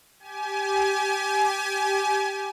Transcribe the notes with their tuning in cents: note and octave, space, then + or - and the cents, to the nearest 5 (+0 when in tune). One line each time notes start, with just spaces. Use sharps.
G4 +0 G#5 +30